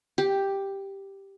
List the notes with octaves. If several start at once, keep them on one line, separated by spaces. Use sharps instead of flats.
G4